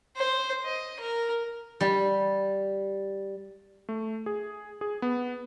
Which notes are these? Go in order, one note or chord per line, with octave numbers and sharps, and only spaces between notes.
C5
D#5
A#4
G3
A3
G#4
G#4
B3